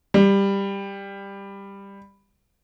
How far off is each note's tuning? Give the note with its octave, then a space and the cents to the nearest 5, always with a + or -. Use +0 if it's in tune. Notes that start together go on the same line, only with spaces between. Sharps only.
G3 +10